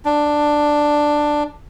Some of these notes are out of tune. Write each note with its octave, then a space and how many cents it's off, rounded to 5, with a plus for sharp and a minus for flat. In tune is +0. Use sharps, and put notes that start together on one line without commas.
D4 +5